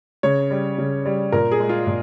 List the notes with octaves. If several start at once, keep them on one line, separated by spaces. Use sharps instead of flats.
C#3 C#5
G3
C#3
G3
A#2 A#4
G#4
G#3
F4
A#2